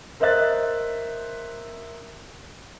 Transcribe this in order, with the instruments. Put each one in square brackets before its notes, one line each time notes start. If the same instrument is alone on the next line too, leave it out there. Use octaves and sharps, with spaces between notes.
[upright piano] A#4 C5 D#5 E5 F#6 A6